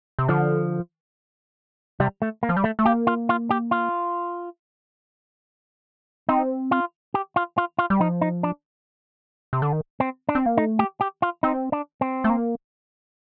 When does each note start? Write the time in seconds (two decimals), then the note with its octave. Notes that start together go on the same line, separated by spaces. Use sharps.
0.19 C3
0.28 D3 F3
2.00 C3 G3
2.22 A3
2.43 A#3
2.49 F3
2.57 G3
2.64 A3
2.79 A3
2.85 A#3 G4
3.07 F4
3.29 F4
3.51 G4
3.71 F4
6.29 C4 D#4
6.71 F4
7.14 G4
7.36 F4
7.58 F4
7.79 F4
7.90 G3
8.01 F3 D#4
8.21 D#4
8.43 D4
9.53 C3
9.62 D3
9.72 D#3
10.00 C4
10.29 D4
10.35 C4
10.46 A#3
10.57 A3 D#4
10.79 G4
11.01 G4
11.22 F4
11.43 C4 D#4
11.72 D4
12.01 C4
12.24 A3
12.30 A#3